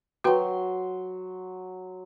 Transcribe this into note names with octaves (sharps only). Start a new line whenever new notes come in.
F#3 F#4 B4 G5 C6